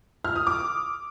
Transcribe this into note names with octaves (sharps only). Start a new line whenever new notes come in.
F6
D#6
D6